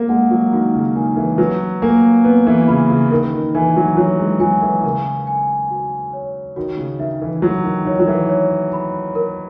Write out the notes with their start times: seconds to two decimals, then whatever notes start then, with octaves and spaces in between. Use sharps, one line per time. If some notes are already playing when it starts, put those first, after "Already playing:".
Already playing: A#3 A#4
0.09 G#3 F#5
0.31 F#3
0.53 D#3 F#4
0.74 C#3
0.95 D#3 G#5
1.17 E3
1.38 F#3 B4
1.82 A#3 G#5
2.24 B3 B4
2.47 E3
2.68 C#3 B5
2.90 C#3
3.11 D#3 A#4
3.33 D#3
3.55 E3 G#5
3.76 F#3
3.97 F#3 C#5
4.19 G#3
4.40 F#3 G#5
4.62 E3
4.83 C#3 A#4
5.27 G#5
5.70 F#4
6.13 C#5
6.56 D#3 F#4
6.77 C#3
6.99 D#3 E5
7.22 E3
7.42 F#3 E4
7.65 D#3
7.85 D#3 C#5
7.99 F#3
8.07 E3
8.29 C#5
8.73 B5
9.15 A#4